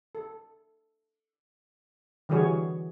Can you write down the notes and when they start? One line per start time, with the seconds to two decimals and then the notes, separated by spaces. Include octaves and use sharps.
0.15 A4
2.29 D3 E3 G3 F#4 G#4 C#5